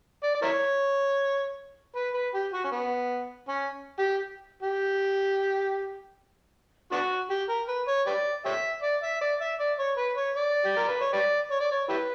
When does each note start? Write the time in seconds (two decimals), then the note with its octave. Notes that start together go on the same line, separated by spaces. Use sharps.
0.23 D5
0.35 D5
0.42 E4 A#4 C#5
1.96 B4
2.14 B4
2.34 G4
2.53 F#4
2.64 C#4
2.71 B3
3.48 C#4
3.99 G4
4.63 G4
6.92 B3 D4 F#4
7.30 G4
7.49 A#4
7.69 B4
7.88 C#5
8.07 G4 B4 D5
8.45 G4 C#5 E5
8.82 D5
9.03 E5
9.21 D5
9.40 E5
9.59 D5
9.79 C#5
9.97 B4
10.17 C#5
10.36 D5
10.65 G4
10.76 A#4
10.88 B4
11.01 C#5
11.13 G4 B4 D5
11.51 C#5
11.60 D5
11.72 C#5
11.89 E4 G4 B4